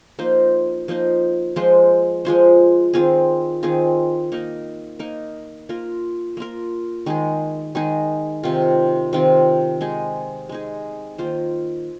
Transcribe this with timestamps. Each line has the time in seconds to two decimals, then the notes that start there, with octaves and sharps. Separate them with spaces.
0.19 F3 A#3 D#4 C5
0.88 F3 A#3 D#4 C5
1.56 F3 G#3 F4 C5
2.25 F3 G#3 F4 C5
2.94 D#3 C4 F4 G#4
3.63 D#3 C4 F4 G#4
4.32 A#3 D#4 A#4
4.99 A#3 D#4 A#4
5.69 A#3 F4 A#4
6.37 A#3 F4 A#4
7.06 D#3 G#3 D#4 G#4
7.75 D#3 G#3 D#4 G#4
8.43 C3 D#3 C4 F4
9.13 C3 D#3 C4 F4
9.81 G#3 D#4 G#4
10.49 G#3 D#4 G#4
11.18 D#3 A#3 F4 C5